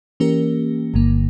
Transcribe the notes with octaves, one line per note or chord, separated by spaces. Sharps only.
E3 A#3 C#4 G4 A#4
G1 G2 D3 A#3